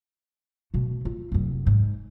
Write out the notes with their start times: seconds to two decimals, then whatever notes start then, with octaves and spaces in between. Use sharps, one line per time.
0.74 B2 A3
1.05 F4
1.32 F1 F#2
1.67 G#2